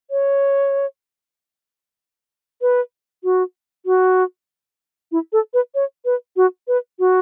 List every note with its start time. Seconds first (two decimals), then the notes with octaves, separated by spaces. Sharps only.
0.11 C#5
2.62 B4
3.24 F#4
3.86 F#4
5.12 E4
5.33 A4
5.54 B4
5.75 C#5
6.05 B4
6.37 F#4
6.68 B4
6.99 F#4